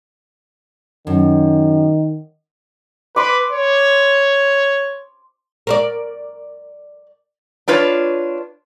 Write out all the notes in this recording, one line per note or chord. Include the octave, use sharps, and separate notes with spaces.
F#2 D#3
B4 C6 D6
C#5
A#4 C5 D5
D4 F4 B4 C#5